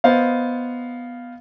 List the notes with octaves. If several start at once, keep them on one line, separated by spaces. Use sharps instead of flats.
B3 C5 D#5 F5